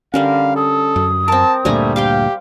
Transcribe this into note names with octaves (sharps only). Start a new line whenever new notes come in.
D3 G3 C#4 A#4 F5
A4 D#6
F#2
C4 A#4 A5
D2 G2 A#2 G3 A3 G#5 A#5
G4 F5 G5 C6